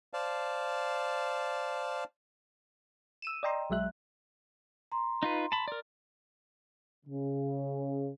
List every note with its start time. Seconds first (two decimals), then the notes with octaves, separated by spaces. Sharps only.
0.13 C5 D5 F5 A5
3.22 E6 D#7 E7
3.43 D5 D#5 G5 A#5 C6
3.70 B1 F#3 G#3 E5 F#6
4.92 A#5 C6
5.23 D#4 F4 B4
5.52 A5 B5
5.68 A#4 D5
7.06 C#3